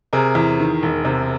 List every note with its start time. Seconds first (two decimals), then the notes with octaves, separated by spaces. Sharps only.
0.13 C3 G#4 A#4
0.35 E2
0.60 D#3
0.83 E1
1.05 C3